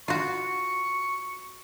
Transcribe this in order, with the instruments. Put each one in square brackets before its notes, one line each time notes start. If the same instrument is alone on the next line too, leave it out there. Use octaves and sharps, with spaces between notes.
[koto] F4 F#4 [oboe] C#6